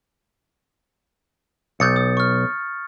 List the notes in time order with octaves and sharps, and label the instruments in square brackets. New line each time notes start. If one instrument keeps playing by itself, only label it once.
[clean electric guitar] B1 [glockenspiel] G6 A6 C#7
[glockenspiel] D#6
C#6 F6